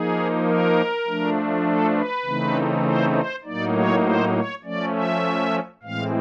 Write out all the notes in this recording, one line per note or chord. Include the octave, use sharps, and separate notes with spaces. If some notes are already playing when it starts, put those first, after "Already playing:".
Already playing: F3 A#3 D#4 G#4
A#4
F3 A3 D4
A4
B4
C#3 E3 A3 C4 D#4
C5
C5
A2 F#3 A#3 D#4 D5
C#5
C5
C#5
F3 A3 C#4 D5
E5
A2 E3 G#3 C4 F5